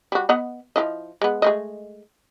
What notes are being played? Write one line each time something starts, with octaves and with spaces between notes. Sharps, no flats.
G3 F#4
B3 D#5 F#5
F3 E4 D#5
G#3 B3
G#3 A3 D#5